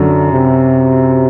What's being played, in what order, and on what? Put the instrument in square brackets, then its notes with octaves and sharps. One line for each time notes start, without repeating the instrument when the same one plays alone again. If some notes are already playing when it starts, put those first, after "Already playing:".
Already playing: [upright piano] F#2 F#3 [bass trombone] D3
[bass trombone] C3